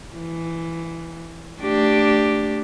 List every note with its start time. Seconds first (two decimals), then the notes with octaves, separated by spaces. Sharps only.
0.15 E3
1.62 A3 D4 G4